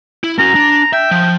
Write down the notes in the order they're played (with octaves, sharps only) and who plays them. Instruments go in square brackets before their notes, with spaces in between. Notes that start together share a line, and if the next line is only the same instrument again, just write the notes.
[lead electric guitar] E4
[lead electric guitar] C#4 F#4 [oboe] A#5
[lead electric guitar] D4
[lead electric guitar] E5 [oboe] G5
[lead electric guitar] F3